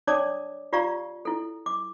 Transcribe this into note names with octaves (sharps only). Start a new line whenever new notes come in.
D4 C#5 D5 A5 D6 D#6
F4 G4 D5 F5 A#5 C#6
E4 A4
D6